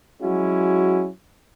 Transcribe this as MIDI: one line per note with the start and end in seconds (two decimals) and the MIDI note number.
0.22 1.08 54
0.22 1.08 56
0.22 1.08 61
0.22 1.08 64
0.22 1.08 66